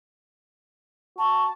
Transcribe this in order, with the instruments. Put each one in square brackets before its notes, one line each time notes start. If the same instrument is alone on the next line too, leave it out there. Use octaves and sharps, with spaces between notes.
[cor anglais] F#4 [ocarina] A5